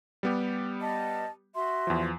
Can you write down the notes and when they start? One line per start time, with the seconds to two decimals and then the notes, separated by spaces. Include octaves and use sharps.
0.23 G3 B3 G4
0.80 D#5 A5
1.54 F#4 E5 C6
1.87 E2 F3